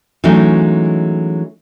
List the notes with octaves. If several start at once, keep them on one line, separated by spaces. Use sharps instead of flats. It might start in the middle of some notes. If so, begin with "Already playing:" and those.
E3 F#3 G#3 A3 C#4 D#4